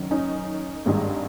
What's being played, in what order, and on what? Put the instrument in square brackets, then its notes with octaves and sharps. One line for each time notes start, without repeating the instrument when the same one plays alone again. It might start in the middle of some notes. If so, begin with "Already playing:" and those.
Already playing: [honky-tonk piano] F#1 F#2 D#3
C#4 D#4
G#1 G2 D#3 G#3